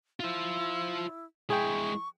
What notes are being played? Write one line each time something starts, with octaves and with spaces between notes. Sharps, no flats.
E4 F4 C5
G#3 E4 G#4 G5 C#6